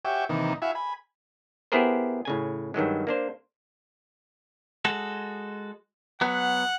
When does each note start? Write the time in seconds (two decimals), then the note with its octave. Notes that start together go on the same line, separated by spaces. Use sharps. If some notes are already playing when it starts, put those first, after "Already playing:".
0.05 F#4 G4 C#5 E5 G5 G#5
0.29 C3 D#3 E3 A#3 D#4
0.62 E4 F#4 E5 F5 G#5
0.75 G#5 B5
1.72 B3 E4 G4 G#4 A#4 C5
2.25 A2 C#3 G#5
2.74 G2 D#3 F#3 G#3
3.07 A#3 D4 C5
4.85 G#3 F#4 A4
6.21 F#3 B3 F#5